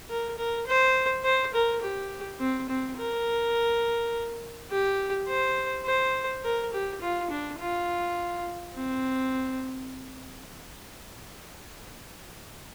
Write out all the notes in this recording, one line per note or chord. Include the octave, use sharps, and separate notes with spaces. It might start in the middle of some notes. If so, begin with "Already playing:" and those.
A#4
A#4
C5
C5
A#4
G4
C4
C4
A#4
G4
C5
C5
A#4
G4
F4
D4
F4
C4